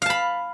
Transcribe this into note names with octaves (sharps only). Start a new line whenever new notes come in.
F5 A5 B5